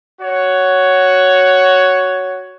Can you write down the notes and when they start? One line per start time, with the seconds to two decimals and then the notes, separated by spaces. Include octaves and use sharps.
0.21 F#4 C#5